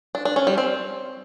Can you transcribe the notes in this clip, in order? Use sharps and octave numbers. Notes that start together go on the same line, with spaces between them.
D4
D4
C#4
G3
C4